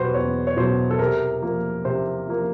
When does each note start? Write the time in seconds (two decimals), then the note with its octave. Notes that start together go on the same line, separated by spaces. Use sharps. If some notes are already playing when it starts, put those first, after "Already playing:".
Already playing: E2 B2 F#3 F#4 G4 B4 C5
0.14 E2 C#5
0.47 C#5
0.57 B2 F#3 C5
0.91 A4
0.99 C3 A#4
1.42 F3 A#3
1.85 C3 C5
2.28 F3 A#3